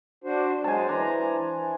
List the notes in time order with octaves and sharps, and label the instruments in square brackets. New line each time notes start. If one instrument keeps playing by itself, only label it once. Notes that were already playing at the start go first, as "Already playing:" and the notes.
[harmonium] D4 F#4 C5
[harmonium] F#3 G#3 C5 [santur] G#5 A5
[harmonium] E3 A#5 [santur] D4 C5
[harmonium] E3